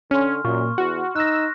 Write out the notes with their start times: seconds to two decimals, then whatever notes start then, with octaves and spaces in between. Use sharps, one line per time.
0.11 D3 C#4 C6 F6
0.45 F#2 A#2 C#6
0.78 E2 F#4
1.15 D#4 E6 F#6 A#6